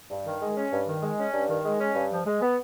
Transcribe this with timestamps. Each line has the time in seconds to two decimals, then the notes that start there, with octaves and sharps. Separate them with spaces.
0.10 G2
0.25 D#3
0.41 G#3
0.57 C#4
0.72 G2
0.86 D#3
1.02 G#3
1.18 C#4
1.33 G2
1.49 D#3
1.65 G#3
1.79 C#4
1.95 G2
2.10 F3
2.26 G#3
2.42 B3